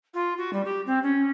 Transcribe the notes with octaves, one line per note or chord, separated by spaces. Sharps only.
F4
F#4
G3
G4
C4
C#4